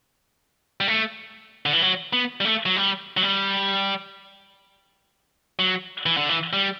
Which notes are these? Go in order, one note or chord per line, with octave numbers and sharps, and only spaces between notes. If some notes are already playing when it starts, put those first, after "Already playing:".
G3
A3
D3
E3
F#3
B3
G3
A3
F#3
G3
F#3
G3
F#3
E3
D3
E3
G3